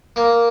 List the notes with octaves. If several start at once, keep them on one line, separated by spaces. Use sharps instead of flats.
A#3